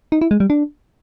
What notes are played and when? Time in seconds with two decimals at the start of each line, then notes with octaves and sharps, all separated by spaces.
0.12 D#4
0.21 E4
0.31 G#3
0.40 G3
0.50 D4